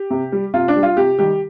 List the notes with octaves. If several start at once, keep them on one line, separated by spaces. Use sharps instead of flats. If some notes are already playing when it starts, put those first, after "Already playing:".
Already playing: G4
C3
G3
C3 F4
D4
G3
F4
C3 G4
D#3 G3 G4